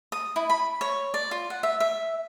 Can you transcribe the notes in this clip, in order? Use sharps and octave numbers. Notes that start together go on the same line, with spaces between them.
D#6
E4
B5
C#5
D5
F4
F#5
E5
E5